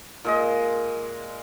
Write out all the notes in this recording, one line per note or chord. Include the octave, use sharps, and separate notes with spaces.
A#2 G#3 D#5